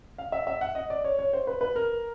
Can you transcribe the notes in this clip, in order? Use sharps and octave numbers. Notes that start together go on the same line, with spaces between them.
F5
E5
E5
F#5
D#5
D5
C#5
C#5
C5
B4
B4
A#4